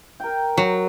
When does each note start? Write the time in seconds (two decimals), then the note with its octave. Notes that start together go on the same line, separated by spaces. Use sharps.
0.20 A#4 G5
0.57 F#3 F#4